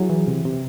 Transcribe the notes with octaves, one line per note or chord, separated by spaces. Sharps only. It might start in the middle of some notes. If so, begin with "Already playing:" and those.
Already playing: F#3 E4 G#4
E3
C3
C3